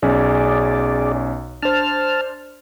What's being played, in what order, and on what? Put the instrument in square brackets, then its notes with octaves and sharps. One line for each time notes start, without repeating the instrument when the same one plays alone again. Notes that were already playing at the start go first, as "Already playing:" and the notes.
[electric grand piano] B1 C#4 [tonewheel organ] G#4 D5
[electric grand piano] D4 C5 [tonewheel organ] A5 F6